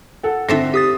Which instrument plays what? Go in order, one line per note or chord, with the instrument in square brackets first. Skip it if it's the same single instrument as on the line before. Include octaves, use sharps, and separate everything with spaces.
[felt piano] A4 F#5
[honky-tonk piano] D3 A#6 [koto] C4 A4 E5 [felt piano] C7
[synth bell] G4 D#6 A6